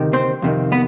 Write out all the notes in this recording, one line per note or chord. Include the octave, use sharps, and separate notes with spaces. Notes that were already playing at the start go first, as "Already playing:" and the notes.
Already playing: D2 C3 D#3
C4 C5
F2 C3 D#3
B3 B4